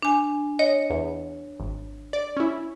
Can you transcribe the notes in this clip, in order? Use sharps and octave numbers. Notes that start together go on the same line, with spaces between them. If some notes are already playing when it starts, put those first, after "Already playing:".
D4 G#5
C#5 D#5
E2
G#1
D5
C#4 E4